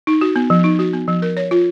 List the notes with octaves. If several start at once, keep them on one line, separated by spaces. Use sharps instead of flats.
D#4
F#4
B3
F3
D#4
F#4
B3
F3
A#4
C#5
F4